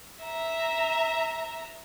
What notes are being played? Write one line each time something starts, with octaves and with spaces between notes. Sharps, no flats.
E5 A#5